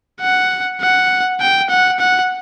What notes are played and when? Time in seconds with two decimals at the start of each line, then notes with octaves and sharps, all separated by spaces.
0.21 F#5
0.81 F#5
1.40 G5
1.70 F#5
2.00 F#5